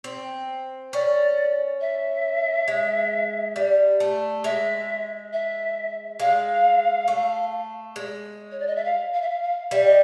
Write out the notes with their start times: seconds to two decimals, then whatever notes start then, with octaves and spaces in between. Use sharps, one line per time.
0.04 C4
0.92 C#4 D5
1.80 E5
2.68 G#3
3.56 G3
4.00 A3
4.44 G#3 E5
5.32 E5
6.19 G#3 F5
7.08 A3
7.96 G#3
8.51 C#5
8.59 D5
8.67 D#5
8.75 E5
8.84 F5
9.13 F5
9.21 E5
9.29 F5
9.42 F5
9.71 G3 E5
9.85 D#5